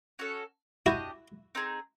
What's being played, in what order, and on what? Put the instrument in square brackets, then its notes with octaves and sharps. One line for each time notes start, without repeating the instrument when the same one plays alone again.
[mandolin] C#4 F#4 A4 C#5
[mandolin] D4 G4 C5 D#5 [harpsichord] E4 F#4
[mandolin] C4 D#4 G#4